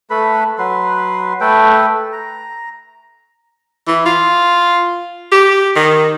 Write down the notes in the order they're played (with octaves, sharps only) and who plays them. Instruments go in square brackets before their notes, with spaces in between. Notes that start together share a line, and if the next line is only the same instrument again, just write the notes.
[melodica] A3 A4 B4 B5
F#3 B4 C6
A3 A4 B4 G5
A#5
[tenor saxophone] E3
F4
G4
D#3